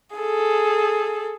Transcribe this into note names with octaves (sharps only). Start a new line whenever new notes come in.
G#4 A4